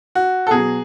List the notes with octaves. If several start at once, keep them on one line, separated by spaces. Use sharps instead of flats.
F#4
A4
B2 F#3 G#4